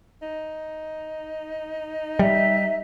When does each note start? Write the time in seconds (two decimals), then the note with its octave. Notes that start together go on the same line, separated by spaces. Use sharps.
0.22 D#4
2.19 G3 E5